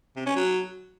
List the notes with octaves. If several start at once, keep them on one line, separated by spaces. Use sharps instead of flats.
C3
C#4
F#3